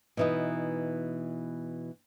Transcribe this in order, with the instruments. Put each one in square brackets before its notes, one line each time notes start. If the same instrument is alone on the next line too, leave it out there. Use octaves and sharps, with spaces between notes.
[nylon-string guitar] B2 E3 D#4